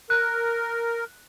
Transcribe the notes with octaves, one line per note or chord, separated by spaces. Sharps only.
A#4 F#6